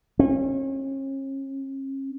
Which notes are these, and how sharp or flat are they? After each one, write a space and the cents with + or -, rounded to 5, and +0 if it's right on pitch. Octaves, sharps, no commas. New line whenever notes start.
C#4 -40